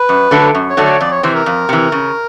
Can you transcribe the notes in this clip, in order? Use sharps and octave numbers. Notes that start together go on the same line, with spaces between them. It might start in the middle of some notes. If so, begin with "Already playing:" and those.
Already playing: B4
F#2
D3 F#3 A3 D4
F#2
C#5
D3 F#3 A3 D4
C#5
F2 D5
C#5
C3 E3 C5
A#4
F2
C3 E3
C#3